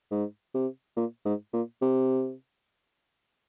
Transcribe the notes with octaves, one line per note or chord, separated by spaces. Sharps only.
G#2
C3
A#2
G#2
A#2
C3